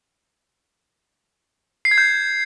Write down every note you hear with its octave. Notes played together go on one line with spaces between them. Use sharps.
C7
G#6
G6